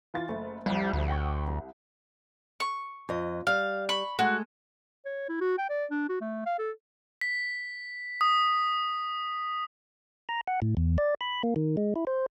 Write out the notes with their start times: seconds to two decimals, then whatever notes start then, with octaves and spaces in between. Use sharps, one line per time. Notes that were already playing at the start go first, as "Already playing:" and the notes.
0.14 E3 F4 A6
0.28 F#1 A3
0.66 C2 F2 G3
0.93 D2
1.08 F#5 G5 C#6
1.48 C2
2.60 C#6
3.09 F2 D#5
3.47 G3 F5
3.89 B5 C#6
4.19 G#3 A3 F#4
5.05 C#5
5.29 E4
5.41 F#4
5.58 G5
5.69 D5
5.91 D4
6.09 F#4
6.21 A3
6.46 F5
6.59 A4
7.21 B6
8.21 D#6
10.29 A#5
10.47 F#5
10.62 A2
10.77 E2
10.98 D5
11.21 B5
11.43 A#3
11.56 D#3
11.77 G#3
11.96 E4
12.07 C5